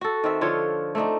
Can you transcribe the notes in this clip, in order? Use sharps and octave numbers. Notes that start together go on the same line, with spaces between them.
F#4 A4
D#3 C4 E5
D3 F3 F4 C#5
A3 C4 D4 D#4